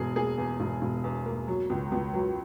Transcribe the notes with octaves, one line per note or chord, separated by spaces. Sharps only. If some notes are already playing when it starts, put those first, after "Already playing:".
Already playing: E1 E2 G#4
A#3 G#4
E2
E1
E1
E2
A#3
F#3
C#2
C#2
F#3